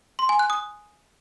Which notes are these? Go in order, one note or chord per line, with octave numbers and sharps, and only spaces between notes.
C6
G#5
F#6
D#6